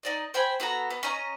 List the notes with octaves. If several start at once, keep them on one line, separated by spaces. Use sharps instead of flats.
D#4 D5 D#5
C5 G5 G#5 B5
B3 F#4 A4 A#5
B3
C#4 D#5 A#5